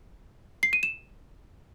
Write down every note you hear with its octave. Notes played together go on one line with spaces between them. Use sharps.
C7
D#7
E7